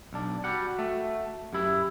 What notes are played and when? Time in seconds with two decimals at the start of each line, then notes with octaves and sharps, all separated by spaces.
0.13 B1 D4
0.44 G3 F#4 F#5
0.79 A3
1.53 F#2 E4 G4